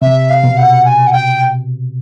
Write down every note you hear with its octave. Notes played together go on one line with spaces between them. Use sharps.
C3 E5
F5
B2
F#5
G#5
F#5
G5